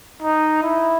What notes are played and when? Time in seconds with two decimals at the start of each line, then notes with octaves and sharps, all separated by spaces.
0.23 D#4
0.63 E4